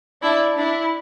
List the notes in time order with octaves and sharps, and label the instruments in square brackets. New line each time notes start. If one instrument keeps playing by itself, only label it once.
[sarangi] D4 [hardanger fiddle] E4
[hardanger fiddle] D4 [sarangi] E4